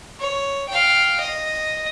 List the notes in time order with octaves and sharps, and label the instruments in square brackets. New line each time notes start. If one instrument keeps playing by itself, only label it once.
[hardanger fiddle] C#5
F5 G5
D#5